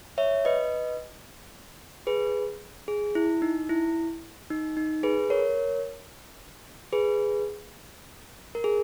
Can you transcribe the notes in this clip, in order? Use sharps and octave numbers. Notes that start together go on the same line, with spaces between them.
C#5 E5
B4 D#5
G#4 B4
G#4
E4
D#4
E4
D#4
D#4
G#4 B4
A#4 C#5
G#4 B4
A#4
G#4